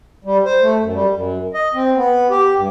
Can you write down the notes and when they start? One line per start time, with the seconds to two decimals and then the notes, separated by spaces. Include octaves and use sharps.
0.25 G3
0.45 C5
0.61 A3
0.80 F#2
0.94 G3
1.11 F#2
1.54 D#5
1.74 C4
1.96 B3
2.30 G4
2.57 G2